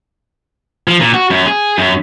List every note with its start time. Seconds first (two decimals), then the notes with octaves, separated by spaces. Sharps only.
0.88 F3
1.00 A#2
1.14 F#4
1.30 F#2
1.46 G#4
1.78 F#2